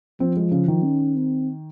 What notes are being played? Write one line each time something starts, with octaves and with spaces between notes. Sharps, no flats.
F3 C4
G#3
C#3
D#3
C#4
C4